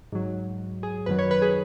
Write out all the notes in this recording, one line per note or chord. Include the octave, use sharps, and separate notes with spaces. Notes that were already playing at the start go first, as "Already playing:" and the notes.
G#2 F#3
G#4
F#2 D#3 F#3 B4
C#5
B4
G#4